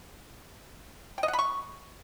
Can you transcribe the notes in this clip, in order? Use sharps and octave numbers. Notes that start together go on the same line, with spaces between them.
G5
D#5
F#5
B5
C#6